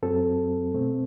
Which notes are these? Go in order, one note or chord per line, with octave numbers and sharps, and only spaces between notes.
F#2 F#3 C4 A4
B2 A3 C4